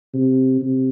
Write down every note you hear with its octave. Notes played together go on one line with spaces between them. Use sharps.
C3
C3